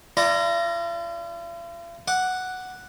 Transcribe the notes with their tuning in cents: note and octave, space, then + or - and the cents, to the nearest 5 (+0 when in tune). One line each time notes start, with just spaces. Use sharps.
F4 -45 D5 +0 A#5 +0
F#5 +0 D6 +0